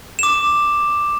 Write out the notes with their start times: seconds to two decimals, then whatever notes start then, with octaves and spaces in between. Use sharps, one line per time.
0.19 D6 E7